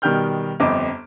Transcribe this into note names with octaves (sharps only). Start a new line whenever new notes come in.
B2 D#3 G3 G5 F6 G6
G1 F2 D#5 D6